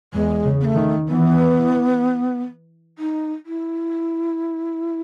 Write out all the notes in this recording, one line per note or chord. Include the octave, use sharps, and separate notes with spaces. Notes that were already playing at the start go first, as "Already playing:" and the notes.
E2 G#3
C#3
B3
A3
D#3
E3 B3
D#4
E4